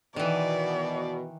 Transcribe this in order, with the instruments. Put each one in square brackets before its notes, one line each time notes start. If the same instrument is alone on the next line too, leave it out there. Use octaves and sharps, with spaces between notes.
[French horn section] B2 [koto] D#3 E3 [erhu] D5